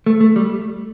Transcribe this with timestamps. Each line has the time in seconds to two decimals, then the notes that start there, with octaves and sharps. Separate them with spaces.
0.06 A3
0.21 A3
0.36 G3